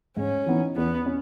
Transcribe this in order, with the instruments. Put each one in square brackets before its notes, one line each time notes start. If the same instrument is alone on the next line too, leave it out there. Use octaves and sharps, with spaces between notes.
[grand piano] G#2 [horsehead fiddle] C#4
[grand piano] E3 B3 D#4
[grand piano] E2 [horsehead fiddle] B3
[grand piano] C#4